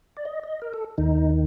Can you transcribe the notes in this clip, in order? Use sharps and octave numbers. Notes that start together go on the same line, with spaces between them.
D5
D#5
D#5
A#4
A4
D#2 D#3 D#4